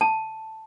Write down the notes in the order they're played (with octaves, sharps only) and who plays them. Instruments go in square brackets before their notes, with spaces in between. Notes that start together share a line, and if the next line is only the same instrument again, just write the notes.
[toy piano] A5